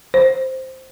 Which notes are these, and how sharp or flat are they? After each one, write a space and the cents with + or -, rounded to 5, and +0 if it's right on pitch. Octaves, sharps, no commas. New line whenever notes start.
C5 +0